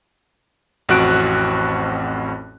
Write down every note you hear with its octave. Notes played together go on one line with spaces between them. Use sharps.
A1 F2 C4 F#4 F#6 D7